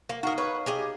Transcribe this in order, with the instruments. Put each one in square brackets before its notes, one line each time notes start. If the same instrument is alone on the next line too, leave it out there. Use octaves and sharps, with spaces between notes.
[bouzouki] A#3
[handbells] D#4 F5 D#6 [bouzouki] F#4 A#4
[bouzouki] B4 C#5
G4 G#4 D#5